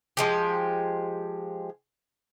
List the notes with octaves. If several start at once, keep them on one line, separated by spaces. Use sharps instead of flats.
F3 G#3 G4